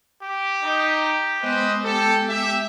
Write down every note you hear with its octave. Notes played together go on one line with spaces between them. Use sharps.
G4
D#4
G#3 B3 B4 C5 D#5
G4 A4
G4 E5